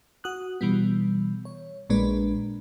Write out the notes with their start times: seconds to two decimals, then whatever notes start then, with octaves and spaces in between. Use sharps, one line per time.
0.24 F#4 D#6 F#6
0.61 B2 E3 G3 B3
1.45 C#5
1.90 A#1 A#2 G#3 D4 B4